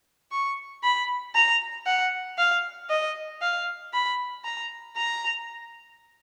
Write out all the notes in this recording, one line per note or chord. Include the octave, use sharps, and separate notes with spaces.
C#6
B5
A#5
F#5
F5
D#5
F5
B5
A#5
A#5